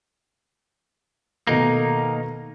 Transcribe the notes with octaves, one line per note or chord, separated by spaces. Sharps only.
B2 D#3 A3 A#3 D#4